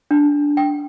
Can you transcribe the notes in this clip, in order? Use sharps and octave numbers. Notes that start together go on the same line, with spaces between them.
D4
G5